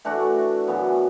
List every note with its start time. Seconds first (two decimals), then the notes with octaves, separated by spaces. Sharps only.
0.05 E3 A3 D4 F#4
0.67 F#2 C#3 E3 B3